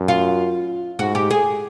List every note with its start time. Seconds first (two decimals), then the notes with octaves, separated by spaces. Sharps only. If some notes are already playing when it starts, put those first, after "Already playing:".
Already playing: F#2
0.08 F4
0.99 G#2 F#4
1.15 G4
1.31 G#4